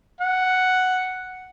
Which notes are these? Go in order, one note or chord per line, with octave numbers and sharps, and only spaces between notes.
F#5